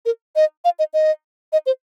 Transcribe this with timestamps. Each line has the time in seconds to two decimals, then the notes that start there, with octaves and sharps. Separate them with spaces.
0.06 A#4
0.36 D#5
0.65 F5
0.79 D#5
0.94 D#5
1.53 D#5
1.66 C5